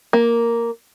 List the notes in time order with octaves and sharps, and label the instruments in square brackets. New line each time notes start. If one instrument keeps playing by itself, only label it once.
[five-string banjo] A#3